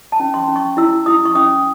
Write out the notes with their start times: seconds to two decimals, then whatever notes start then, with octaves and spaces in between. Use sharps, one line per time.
0.12 A5
0.20 C#4
0.34 C6
0.48 C#4
0.56 C#6
0.77 E4 E6
1.06 E4 D#6
1.25 C#6
1.35 C#4 D#6